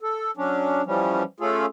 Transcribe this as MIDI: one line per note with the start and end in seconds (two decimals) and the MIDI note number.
0.01 0.31 69
0.37 0.82 54
0.37 0.82 61
0.37 0.82 62
0.86 1.23 52
0.86 1.23 53
0.86 1.23 55
0.86 1.23 61
1.40 1.66 57
1.40 1.66 61
1.40 1.66 65
1.40 1.66 68
1.40 1.66 69